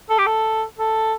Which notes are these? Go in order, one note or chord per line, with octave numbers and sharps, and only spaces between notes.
A4
G4
A4
A4